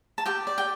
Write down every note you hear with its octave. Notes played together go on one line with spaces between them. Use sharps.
A5
G4 G5
D5
G5